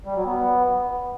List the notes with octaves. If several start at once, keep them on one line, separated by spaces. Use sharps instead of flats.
G3
F#3
B3